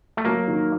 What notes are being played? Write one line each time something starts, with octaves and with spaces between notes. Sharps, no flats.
A3
F#3 A#3
D#3